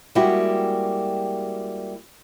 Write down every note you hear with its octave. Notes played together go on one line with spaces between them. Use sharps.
G3 G#3 A#3 E4 F#4 G4